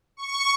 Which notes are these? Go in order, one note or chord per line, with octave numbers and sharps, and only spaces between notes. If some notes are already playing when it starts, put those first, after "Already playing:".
C#6